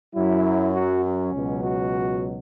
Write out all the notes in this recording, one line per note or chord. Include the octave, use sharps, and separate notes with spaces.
F#2 F#3 E4
F#4
C#4
C#2 B2 F#3
F#4